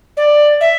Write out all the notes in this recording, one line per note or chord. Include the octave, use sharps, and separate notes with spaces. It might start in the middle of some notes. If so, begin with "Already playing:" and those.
D5
E5